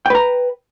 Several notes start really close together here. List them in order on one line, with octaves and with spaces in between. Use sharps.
G5 B4 A#5